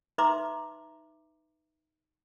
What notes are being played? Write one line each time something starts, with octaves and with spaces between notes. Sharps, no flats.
D#4 B4 E5 A#5 C6 D6